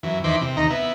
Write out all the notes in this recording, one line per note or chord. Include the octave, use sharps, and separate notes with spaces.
F#2 E3
E2 D#3 E3 C5 B5 D6
C3
D#2 D#4 A#5
B3 E4